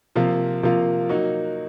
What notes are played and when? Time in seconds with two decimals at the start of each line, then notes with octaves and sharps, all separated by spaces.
0.16 C3 F3 A#3 F4
0.63 C3 F3 A#3 F4
1.09 F#3 A#3 D#4 F#4